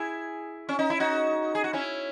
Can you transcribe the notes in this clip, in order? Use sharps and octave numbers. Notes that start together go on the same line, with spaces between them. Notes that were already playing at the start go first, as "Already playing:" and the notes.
Already playing: E4 G#4
C#4
D#4
E4
D#4 F#4
G#4
F#4
C#4 E4